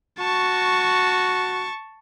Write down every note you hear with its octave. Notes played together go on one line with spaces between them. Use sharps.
F#4 A5 C#6